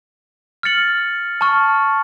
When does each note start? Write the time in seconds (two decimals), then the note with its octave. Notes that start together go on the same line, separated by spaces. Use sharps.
0.63 F6 A6 C#7 F#7
1.41 A5 C#6 F6